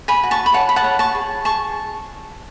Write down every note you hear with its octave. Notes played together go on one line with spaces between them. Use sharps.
G#5 B5
F#4
A5 C#6
B5
C#5 F#5 A5
B5
F#5 A5
C#5
A5 C#6
G#4
G#4 A5 C#6